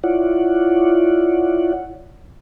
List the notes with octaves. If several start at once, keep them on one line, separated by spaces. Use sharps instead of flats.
E4 F4 C#5 D5 F#5